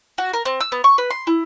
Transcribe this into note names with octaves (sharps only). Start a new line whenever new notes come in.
F#4
A#4
C4
E6
B3
C#6
B4
C6
E4